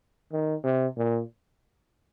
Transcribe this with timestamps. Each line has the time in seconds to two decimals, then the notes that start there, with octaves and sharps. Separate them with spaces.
0.33 D#3
0.64 C3
0.98 A#2